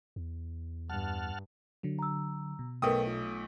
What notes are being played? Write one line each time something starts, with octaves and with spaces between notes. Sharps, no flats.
E2
G2 F#5 A5 F6
D3 F#3
A#5 E6
B2
B1 B2 A3 A#4 B4 G5 D#6
F4